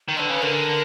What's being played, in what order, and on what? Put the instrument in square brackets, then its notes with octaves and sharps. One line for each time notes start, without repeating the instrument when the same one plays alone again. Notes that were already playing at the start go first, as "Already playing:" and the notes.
[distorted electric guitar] D#3
[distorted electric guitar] D3 [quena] B4 D#5
[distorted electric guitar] C#3
[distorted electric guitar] D3 [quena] A#4